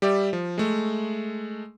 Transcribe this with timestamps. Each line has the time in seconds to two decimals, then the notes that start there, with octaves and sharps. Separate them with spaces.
0.02 G3 G4 D5 E5
0.33 F3
0.58 G#3 A3